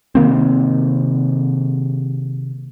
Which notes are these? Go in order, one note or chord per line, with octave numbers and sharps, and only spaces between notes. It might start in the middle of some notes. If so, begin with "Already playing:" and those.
C3 D#3 A#3 C4